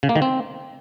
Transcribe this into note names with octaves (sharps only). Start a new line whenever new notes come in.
C#3
A#3
D#3
C4